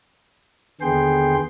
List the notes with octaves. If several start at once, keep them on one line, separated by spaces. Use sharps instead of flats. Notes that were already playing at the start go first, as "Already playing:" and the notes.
D#2 D3 B3 G#4 G5 C6